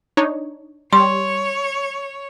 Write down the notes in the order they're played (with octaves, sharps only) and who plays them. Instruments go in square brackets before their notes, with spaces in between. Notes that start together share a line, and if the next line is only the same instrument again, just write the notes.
[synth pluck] D4 D#4 C#5
[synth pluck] G3 [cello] C#5 [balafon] C6